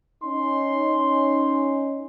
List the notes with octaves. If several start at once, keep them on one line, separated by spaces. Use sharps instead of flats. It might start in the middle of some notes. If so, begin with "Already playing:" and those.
C#4 D#4 C6